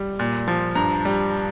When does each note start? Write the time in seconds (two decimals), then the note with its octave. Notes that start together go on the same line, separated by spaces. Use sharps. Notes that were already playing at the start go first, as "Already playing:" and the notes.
Already playing: G3
0.19 A#2
0.48 F3
0.75 G2 A#5
1.05 G3